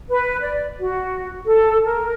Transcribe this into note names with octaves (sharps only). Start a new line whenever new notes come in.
B4
D5
F#4
A4
A#4